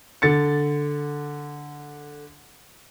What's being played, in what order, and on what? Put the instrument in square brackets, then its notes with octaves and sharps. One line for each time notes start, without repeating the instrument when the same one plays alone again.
[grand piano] D3 A6 C#7